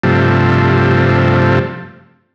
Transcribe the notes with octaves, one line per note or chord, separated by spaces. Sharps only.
G2 C3 F3 A3